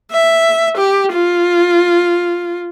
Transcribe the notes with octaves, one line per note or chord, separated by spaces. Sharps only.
E5
G4
F4